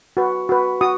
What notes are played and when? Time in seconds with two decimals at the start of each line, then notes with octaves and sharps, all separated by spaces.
0.17 F#4 B4
0.49 F#4 B4
0.81 F#4 D#6